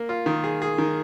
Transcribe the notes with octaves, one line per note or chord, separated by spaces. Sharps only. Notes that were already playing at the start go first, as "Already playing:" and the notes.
Already playing: A#3
F4
D#3
G#4
G#4
D#3